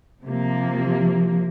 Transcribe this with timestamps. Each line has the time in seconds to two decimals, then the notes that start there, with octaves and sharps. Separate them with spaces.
0.23 C3 F3 A#3